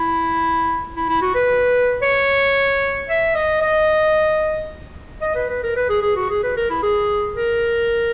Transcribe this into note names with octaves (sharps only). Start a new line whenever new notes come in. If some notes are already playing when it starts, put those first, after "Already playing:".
Already playing: E4
E4
E4
F#4
B4
C#5
E5
D#5
D#5
D#5
B4
B4
A#4
B4
G#4
G#4
F#4
G#4
B4
A#4
E4
G#4
A#4